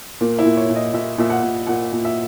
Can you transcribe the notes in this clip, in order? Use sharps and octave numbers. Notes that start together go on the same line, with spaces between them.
A#2 A#3
E4
A#2
C#5
A#2
D#5
A#2 E5
A#2 E5
F#5
A#2
A#2 F#5
A#2
E5